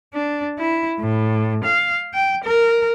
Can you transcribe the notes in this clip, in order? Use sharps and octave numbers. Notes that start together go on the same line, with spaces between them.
D4
E4
A2
F5
G5
A#4